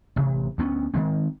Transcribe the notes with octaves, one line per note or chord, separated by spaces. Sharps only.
A1 C3
D2 B3 C#4
D#3 E3 G#3 C4